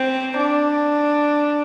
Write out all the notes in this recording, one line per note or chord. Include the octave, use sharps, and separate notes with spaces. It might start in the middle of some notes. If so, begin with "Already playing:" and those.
Already playing: C4
D4